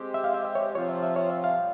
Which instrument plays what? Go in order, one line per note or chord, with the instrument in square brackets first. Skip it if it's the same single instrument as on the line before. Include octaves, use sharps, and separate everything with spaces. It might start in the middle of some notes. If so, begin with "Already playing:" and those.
Already playing: [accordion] G#3 C4 G4
[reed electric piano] E5
F5
E5
E5
C#5
[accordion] C3 F3 C4 F4 [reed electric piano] C#5
[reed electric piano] E5
E5
C#5
E5
F5
[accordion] A#2 G3